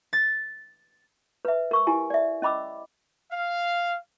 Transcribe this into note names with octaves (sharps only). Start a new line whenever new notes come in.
A6
B4 E5
A#4 C#6 E6
E4 G4 G#5
D5 E5
C#4 D#5 B5 D6 E6
F5